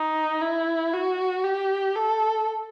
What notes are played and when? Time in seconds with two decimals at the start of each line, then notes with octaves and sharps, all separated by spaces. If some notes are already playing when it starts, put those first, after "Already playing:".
Already playing: D#4
0.41 E4
0.93 F#4
1.44 G4
1.95 A4